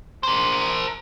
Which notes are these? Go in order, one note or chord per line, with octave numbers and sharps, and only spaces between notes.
A#4 C5